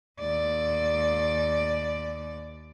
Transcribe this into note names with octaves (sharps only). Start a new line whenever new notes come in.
D#2 D5